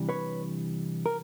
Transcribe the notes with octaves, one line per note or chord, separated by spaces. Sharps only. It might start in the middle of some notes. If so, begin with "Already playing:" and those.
Already playing: C3 E3 G3 D4
B4 C#5
A#4